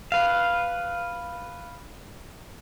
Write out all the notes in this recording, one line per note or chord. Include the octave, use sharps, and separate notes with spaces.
B4 F5